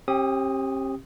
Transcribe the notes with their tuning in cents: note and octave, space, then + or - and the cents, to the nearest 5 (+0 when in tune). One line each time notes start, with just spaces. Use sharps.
C4 +45 G4 +0 D#6 +0